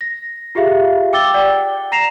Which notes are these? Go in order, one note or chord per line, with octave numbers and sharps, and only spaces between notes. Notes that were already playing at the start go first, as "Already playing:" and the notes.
A#6
F4 G4 G#4 E5 F5
G5 D6 E6 A6 G7
D5 F#5 G5
A#5 A#6 C7 E7 F7